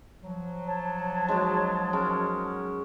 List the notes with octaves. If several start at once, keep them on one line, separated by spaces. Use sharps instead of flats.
F3 F#3
C#5 A5
G#3 D#4 F#4
G#3 C#4 A#4